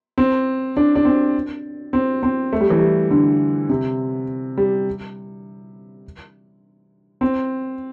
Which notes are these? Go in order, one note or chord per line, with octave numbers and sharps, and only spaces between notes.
C4
D4
D4
C4
C4
C4
A3
G3
E3
G3
D3
C3
G3
C4